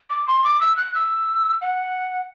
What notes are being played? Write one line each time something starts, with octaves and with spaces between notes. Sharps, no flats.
D6
C6
D6
E6
F#6
E6
F#5